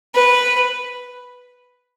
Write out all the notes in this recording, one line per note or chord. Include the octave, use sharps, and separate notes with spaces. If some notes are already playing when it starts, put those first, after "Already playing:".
B4